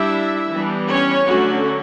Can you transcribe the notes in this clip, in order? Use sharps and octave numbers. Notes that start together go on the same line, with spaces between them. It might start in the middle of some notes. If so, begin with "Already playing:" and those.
Already playing: G3 D4 E4 E5
E3 G3 B3 D4
C#4 C#5
D3 F#3 A3 C#4 F#4